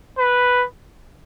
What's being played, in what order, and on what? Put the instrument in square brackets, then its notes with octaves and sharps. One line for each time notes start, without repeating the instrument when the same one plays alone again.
[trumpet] B4